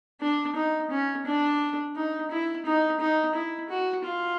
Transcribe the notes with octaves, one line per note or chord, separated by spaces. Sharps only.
D4
D#4
C#4
D4
D#4
E4
D#4
D#4
E4
F#4
F4